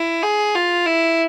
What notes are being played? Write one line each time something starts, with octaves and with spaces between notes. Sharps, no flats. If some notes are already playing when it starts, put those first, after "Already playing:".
Already playing: E4
G#4
F4
E4